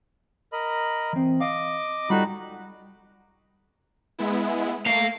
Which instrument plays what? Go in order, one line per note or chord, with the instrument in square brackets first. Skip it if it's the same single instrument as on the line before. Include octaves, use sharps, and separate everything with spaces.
[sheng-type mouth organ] A#4 D#5 B5
[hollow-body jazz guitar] E3 C4
[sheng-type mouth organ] D#5 D6 [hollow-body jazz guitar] F5
[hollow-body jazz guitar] G3 F4 A4 [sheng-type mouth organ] D#4 F#4 B5
[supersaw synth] G#3 B3 E4
[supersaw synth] A3 [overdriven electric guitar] A#3 F5